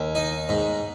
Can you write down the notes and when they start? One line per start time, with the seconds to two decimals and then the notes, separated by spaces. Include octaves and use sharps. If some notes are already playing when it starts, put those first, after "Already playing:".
Already playing: D#2
0.15 D#4
0.49 G#2